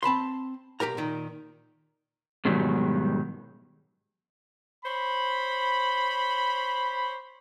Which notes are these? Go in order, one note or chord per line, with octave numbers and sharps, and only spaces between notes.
C4 A5 B5 C6
B1 C#3 G4 A#4 A#5
A#2 D#3
G#2 B2 D#3 F#3 G3
C5 C#5 B5